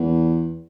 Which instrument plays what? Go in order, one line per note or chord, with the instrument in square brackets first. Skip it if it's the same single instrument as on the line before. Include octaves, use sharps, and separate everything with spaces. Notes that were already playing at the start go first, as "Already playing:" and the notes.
Already playing: [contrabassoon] E2